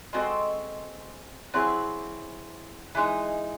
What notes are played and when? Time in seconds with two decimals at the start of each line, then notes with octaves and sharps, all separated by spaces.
0.13 G#3 C4 F#4 A4 D#5
1.54 F#3 C4 E4 G#4
2.95 E3 G#3 D#4